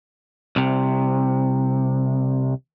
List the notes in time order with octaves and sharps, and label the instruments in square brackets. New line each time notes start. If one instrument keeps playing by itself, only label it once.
[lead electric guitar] C2 C3